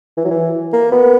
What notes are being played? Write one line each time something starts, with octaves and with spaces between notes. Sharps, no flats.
E3
F#3
E3
A#3
B3